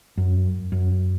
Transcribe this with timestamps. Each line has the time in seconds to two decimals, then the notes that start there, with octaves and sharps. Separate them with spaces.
0.17 F#2
0.72 F#2